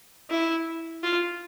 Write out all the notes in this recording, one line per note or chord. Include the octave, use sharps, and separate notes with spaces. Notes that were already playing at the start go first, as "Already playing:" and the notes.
E4
F4